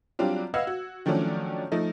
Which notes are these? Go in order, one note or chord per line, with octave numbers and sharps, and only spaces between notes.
F#3 G3 C4 D4 F4
B4 D#5 F5 F#5 E6 G#6
F#4
D#3 F3 F#3 A3 C#4 D4
F3 A3 D#4